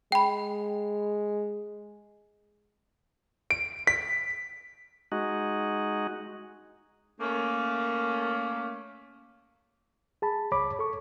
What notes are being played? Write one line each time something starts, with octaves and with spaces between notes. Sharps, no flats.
G#3 G5 B5
D7
B6
G#3 D#4 F#4
A3 A#3 C#4
G#4 A5 B5
C#2 C#5 B5 D6
A4 C#6